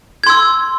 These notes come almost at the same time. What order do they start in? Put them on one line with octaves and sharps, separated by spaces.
G#6 C6 E6